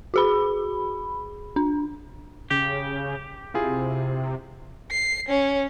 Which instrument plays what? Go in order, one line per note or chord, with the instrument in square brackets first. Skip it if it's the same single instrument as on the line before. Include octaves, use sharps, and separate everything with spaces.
[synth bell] F#4 G#4 B5
D4
[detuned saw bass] C#3 [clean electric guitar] G4
[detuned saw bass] C3 [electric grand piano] E4 F4 G#4
[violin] C7
C#4